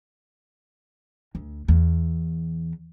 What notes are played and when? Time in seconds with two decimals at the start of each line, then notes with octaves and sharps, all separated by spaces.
1.35 D2
1.68 E2